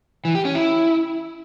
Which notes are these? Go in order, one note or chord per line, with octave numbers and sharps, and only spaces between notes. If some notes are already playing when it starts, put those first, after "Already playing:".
E3
G4
C#4
E4